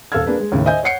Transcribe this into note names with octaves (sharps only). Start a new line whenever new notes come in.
D#1 A4 F5 E6 F6 G#6
A#3 D4 G#4 B4
G#3
D#2 A2 C#3
C5 D#5 E5 G#5 G6
C#5 F#5 C7 C#7